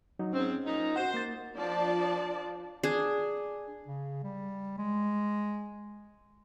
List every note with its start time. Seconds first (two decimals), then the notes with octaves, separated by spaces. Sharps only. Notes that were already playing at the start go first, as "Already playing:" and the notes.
0.19 F#3 D#4
0.33 G#2 C4 C#4
0.65 A#2 D#4
0.96 F#4 C5 F#5
1.14 A#3 A6
1.57 F3 D4 D5 A5
2.83 D4 G#4
3.87 C#3
4.23 G3
4.78 G#3